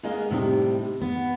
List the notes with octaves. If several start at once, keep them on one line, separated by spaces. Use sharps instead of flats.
G#3 A#3 B3 G#4 D#5 F5
A2 C3 G3 D#4
B3